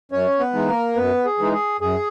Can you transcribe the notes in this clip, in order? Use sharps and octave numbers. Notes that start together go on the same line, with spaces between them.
F#2 C#4 C#5
B3 B4
E3 G#3 D#4
A#3 A#4
F#2 B3 B4
G#4
E3 G#3 D#4
G#4
F#2 G#4